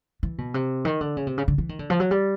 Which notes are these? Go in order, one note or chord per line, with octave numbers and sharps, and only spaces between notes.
E3
B2
C3
D#3
D3
C#3
C3
C#3
D3
E3
D#3
D3
F3
F#3
G3